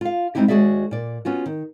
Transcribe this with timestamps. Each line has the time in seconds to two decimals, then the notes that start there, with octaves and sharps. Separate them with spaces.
0.01 F4 F5
0.35 G3 G#3 C4 D#4 E4 G4
0.48 D#2 G#3 F#4 G#4 D5 E5
0.91 A#2 D5
1.25 B3 C#4 F4 F#4
1.46 D#3